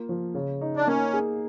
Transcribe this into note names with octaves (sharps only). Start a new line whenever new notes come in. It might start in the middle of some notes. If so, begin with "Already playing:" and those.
Already playing: A#3 F4
F3
C#3
D#4
D4
A#3 C#4
G#4